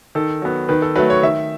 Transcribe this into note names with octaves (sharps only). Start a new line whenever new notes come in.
D#3 A4
F#3 B3
D#3 B4
A4
F#3 A3 B4
C#5
D#3 E5